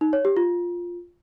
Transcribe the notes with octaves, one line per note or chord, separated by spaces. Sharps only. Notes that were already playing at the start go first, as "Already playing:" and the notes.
D#4
C#5
G4
F4